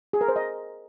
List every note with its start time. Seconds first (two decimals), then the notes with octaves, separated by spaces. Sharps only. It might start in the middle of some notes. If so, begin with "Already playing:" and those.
0.13 G#4
0.21 A#4
0.28 C5
0.36 D#5